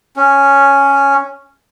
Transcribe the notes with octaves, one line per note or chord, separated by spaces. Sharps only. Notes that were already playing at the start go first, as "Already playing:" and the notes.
C#4